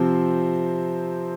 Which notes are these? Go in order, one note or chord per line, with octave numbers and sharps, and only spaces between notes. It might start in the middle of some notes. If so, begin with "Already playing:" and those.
Already playing: C3 F3 C4 C5